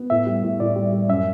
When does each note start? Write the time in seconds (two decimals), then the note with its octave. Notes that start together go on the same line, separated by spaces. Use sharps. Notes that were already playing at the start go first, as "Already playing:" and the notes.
Already playing: B3
0.10 A2 E5
0.26 G3
0.43 A2
0.60 A2 D5
0.76 G3
0.93 G3
1.09 F#2 E5